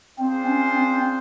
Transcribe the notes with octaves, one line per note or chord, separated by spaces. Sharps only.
C4 D4 F4 G#4 C5
C#4
C4